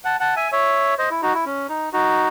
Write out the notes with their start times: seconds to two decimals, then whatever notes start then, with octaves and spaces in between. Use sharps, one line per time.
0.05 F#5 A5
0.20 F#5 A5
0.36 E5 G#5
0.52 C#5 E5
0.98 C5 D#5
1.11 E4
1.22 D#4 F#4
1.34 E4
1.46 C#4
1.69 D#4
1.93 D#4 F#4